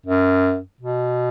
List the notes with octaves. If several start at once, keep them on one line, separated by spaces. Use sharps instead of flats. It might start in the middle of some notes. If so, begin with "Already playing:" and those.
F#2
B2